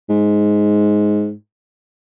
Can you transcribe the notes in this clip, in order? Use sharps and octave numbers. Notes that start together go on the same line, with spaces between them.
G#2